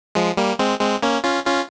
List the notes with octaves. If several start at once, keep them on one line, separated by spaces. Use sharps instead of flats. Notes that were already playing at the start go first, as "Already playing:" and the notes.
F3 G#3
G3 A#3
G#3 C4
G#3 C4
A#3 C#4
C#4 F4
C#4 F4